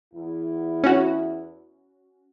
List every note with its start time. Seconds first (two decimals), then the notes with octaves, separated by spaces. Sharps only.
0.14 E2 E4
0.84 C#4 F#4